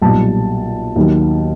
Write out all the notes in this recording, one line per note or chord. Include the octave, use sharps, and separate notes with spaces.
B1 A#2 G3 A5
D#2 D#3 F#3